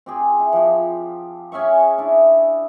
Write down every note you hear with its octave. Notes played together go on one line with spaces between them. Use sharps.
C4 G4 G#4
E4
F3 G4
C#4 G#4 E5 C#6
D4 E4